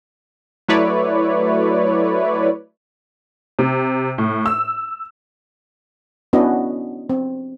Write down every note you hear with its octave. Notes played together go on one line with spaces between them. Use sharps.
F#3 A3 E4 B4 C#5 D5
C3
A2
E6
B3 C#4 D4 E4 F#4 D#5
C4